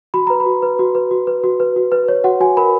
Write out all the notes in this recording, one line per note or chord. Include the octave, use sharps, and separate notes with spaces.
F#4 B5
B4 A#5
B5
F#4
B4
F#4
B4
F#4
B4
F#4
B4
F#4
B4
C#5
F#4 F#5
F#4 G#5
A#4 B5